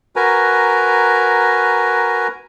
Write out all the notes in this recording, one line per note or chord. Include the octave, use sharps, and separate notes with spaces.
F#4 A#4 B4 G#5 A#5